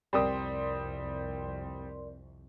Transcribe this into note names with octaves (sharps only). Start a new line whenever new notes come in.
C2 F2 G3 C4 A#4 D5 C6 D#6